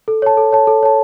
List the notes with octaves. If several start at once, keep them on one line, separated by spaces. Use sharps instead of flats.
A4
C#5 A5
A4
C#5 A5
A4
C#5 A5